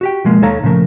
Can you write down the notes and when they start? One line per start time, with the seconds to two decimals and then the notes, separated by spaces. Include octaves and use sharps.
0.01 F#4 G4 G5
0.25 B2 F3 G#3 A#3
0.42 D#2 D#3 A4 C#5 F5 A#5
0.63 A#2 C#3 F3 A3 A#4